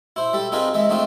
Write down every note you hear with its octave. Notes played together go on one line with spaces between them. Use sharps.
E4 C5
G3 A4
C4 D#4 F4 G#4 A#4 B4
E3 G#3 E5
A3 C4 D4 D#4 F4